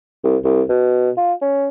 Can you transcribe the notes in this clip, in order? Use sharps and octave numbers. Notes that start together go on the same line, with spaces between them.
C2
C2
B2
F4
C#4